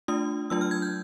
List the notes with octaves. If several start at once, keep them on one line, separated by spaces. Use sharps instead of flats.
A3 D4 F4 D#6
F#3 A3 D4 F4 E6
F6
G#6
G6